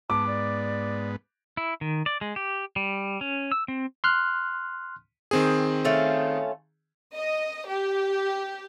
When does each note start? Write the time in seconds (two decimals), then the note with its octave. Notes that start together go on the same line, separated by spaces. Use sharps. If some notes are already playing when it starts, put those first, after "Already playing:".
0.10 G#2 B3 A5 D6
0.27 D5
1.57 E4
1.81 D#3
2.06 D5
2.21 G#3
2.36 G4
2.76 G3
3.21 C#4
3.52 E6
3.68 C4
4.04 C6 F6 F#6
5.31 D#3 C4 G#4
5.85 A3 C#4 F4
7.14 D#5
7.67 G4